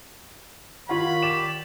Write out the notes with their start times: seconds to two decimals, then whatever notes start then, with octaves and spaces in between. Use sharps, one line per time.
0.89 D#3 F4 C#5 F5 F#5 B5
1.23 G4 D5 E7